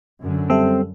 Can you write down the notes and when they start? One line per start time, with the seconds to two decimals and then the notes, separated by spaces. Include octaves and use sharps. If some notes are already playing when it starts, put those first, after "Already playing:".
0.21 F#2 D3
0.50 G3 C4 A4 E5